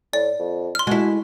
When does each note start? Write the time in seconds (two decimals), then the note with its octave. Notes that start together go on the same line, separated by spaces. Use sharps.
0.13 A2 D5
0.39 F2
0.75 C6 F6
0.87 G#3 E4 F#4